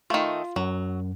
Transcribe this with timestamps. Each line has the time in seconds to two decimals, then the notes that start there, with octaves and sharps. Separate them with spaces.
0.10 D#3 A3 F4
0.56 F#2 F#3